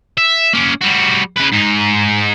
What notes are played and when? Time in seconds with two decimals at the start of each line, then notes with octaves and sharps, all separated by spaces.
0.18 E5
0.53 A#3 C#4
0.81 G3 F#4
1.36 C#3 B4
1.52 G#2 D#4